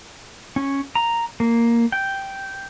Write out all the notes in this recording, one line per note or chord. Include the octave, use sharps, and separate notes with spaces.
C#4
A#5
A#3
G5